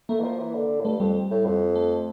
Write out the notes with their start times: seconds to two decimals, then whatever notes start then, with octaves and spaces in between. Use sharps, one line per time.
0.09 A3 A#3
0.20 E3
0.24 F3
0.39 E3
0.55 D3
0.80 A2
0.85 G2 A3
1.00 F2 G3
1.15 G3
1.31 A2
1.45 F2
1.75 A3